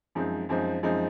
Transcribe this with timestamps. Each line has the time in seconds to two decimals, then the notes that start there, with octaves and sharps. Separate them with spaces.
0.15 F#2 F3 G#3 C4 D#4
0.49 F#2 F3 G#3 C4 D#4
0.83 F#2 F3 G#3 C4 D#4